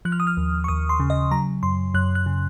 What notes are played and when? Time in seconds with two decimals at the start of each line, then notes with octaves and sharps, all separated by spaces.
0.05 F3 F#6
0.12 F6
0.20 D#6
0.27 F6
0.37 D#2
0.64 C#6
0.68 D#2 D#6
0.89 C6
1.00 C#3
1.10 D#5
1.31 F#3 A#5
1.63 F#2 C6
1.94 F#2 F#6
2.15 F#6
2.26 C#3